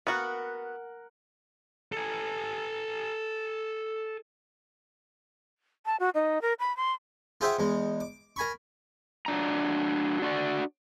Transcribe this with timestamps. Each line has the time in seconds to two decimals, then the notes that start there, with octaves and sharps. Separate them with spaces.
0.07 B3 F#4 A#4 F#5
1.92 A4 G#5
5.86 A5
6.00 F#4
6.15 D#4
6.42 A#4
6.60 B5
6.77 C6
7.41 F4 G#4 C5 E5 F#5 G5
7.59 E2 G#3
8.00 D6
8.36 A#4 G#5 B5 C#6
9.26 F#3 D4 A#5
10.22 D4 F#4 D5